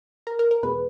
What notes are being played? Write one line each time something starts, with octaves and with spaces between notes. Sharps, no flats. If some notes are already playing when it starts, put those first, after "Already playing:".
A#4
A#4
A#4
E2 B2 G#3 B4